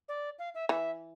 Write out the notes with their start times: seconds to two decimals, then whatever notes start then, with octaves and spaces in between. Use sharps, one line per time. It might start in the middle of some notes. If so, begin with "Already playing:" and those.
0.09 D5
0.39 F5
0.55 E5
0.69 E3 E5